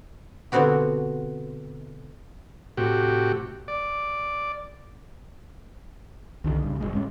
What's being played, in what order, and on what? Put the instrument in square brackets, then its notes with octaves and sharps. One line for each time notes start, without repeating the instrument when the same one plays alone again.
[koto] B2 D3 B3 C4 F#4 G4
[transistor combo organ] A2 C3 F#4 G4
D5
[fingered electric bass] C2 D3 D#3
G2 C#3
F#1 C2 G#3
A1 G#3 C#4